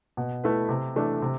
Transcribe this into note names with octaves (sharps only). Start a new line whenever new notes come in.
B2
A3 E4 B4
C3
E3 A3 D4
C3